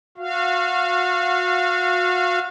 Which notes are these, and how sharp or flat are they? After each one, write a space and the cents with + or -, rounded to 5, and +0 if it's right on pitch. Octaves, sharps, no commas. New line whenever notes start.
F#4 -35 F5 -25